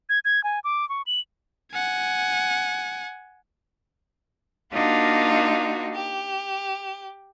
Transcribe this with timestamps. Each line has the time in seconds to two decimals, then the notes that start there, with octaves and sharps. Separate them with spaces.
0.09 G#6
0.25 G#6
0.44 G#5
0.64 D6
0.89 C#6
1.07 F#7
1.72 F#5 G#5
4.73 A#3 D4 D#4 F4 F#4
5.93 G4